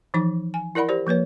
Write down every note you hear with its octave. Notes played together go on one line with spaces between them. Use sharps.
E3 F3 D#4 D6
G#5
E4 A#4 D5 F#5 B5
G4 C5 D5
F3 A#3 B4 C#5